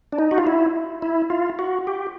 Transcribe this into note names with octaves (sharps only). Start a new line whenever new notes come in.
D4
D#4
F#4
F4
E4
E4
F4
F#4
G4